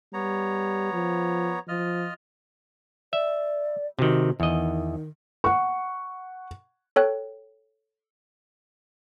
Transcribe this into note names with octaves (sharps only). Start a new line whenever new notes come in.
G3 B3 C#5 A#5
F3
F3 F4 D#5 F6
D5 E5
C3 D#3 F#4
E2 D#3 D#5
F#5 C#6
A4 C#5 G5 F#6